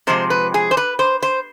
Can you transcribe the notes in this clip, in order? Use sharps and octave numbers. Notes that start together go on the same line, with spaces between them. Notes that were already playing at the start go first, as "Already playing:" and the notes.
C3 F3 G#3 C5
B4
G#4
C5
B4
C5
C5